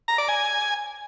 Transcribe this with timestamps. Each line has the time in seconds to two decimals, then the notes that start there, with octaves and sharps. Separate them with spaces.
0.08 A#5
0.18 D5
0.28 G#5